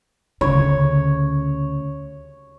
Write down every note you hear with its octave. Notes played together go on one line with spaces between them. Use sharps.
D2 C#3 C#5